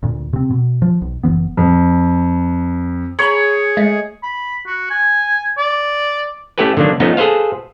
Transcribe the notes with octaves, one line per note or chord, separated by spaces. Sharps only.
D2 A#2
C3 C4
B2
F3
B1
F#1 D#2 E3 B3
F2
G#4 C#5 A#5 B5
G#3 A3
B5
F#4
G#5
D5
A3 C#4 E4 G4 A4 B4
D3 D#3 F#3 A#3 D4
F3 A3 B3 C#4 D#4
G#4 A4 B4 C5 F5